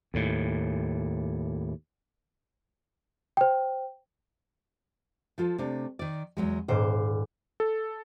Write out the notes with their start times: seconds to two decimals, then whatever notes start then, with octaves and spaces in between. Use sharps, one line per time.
0.14 D#2 A2
3.37 C5 G5
5.38 F3 F4 A4
5.58 C3 A3 D4
5.99 D#3 D5
6.37 E2 F#3 G#3
6.68 D#1 G#2 C5
7.60 A4